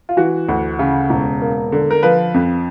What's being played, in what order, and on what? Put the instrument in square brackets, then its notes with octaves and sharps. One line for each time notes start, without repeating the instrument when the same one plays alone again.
[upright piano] F4
E3 F#4
D2
C#3
E1
A#3
D3
A#4
F3 B4
F2